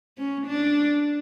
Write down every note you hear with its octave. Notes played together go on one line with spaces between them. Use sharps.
C#4
D4